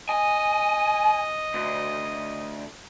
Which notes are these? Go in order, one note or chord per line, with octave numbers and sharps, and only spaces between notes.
D#5 G#5
D2